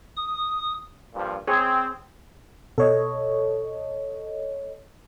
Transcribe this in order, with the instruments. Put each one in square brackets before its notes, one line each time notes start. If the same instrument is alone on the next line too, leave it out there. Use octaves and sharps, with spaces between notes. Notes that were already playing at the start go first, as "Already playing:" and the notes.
[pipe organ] D#6
[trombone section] G2 A#2 F3
[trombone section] C4 [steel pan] G#4 C#5
[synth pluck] B2 [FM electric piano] A4 C#5 D#5